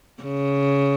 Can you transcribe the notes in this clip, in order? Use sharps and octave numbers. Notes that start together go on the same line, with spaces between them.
C#3